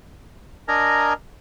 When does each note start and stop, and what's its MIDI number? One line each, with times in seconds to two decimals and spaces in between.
0.68 1.13 62
0.68 1.13 70
0.68 1.13 75
0.68 1.13 80
0.68 1.13 82